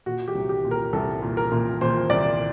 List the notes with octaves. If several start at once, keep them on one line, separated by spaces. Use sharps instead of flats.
A#2 F#4
G4
C2
G4
A#2
A#4
C2 A4
A#2
A#4
A#2
A#2 C5
C2 D5